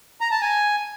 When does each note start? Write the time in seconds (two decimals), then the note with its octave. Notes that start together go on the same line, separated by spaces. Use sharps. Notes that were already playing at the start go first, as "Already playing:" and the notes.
0.21 A#5
0.31 A5
0.41 G#5